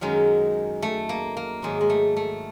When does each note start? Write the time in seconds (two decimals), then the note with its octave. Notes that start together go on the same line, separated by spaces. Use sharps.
0.01 F#2 D#3 F#3 G#3
0.82 A3
1.09 A#3
1.37 A#3
1.62 G#2 D#3 F#3 G#3
1.81 G#3
1.90 A3
2.17 A3